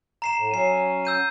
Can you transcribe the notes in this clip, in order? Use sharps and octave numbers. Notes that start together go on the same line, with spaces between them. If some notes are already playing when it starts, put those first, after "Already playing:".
A#5 C7 E7
A2
F#3 C#4 C7 D#7
E6 G6 D#7